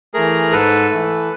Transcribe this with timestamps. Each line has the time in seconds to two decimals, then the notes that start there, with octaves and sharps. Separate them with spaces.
0.14 E3 A3 G#4 A#4
0.52 G#2 A4 B4
0.91 E3 A3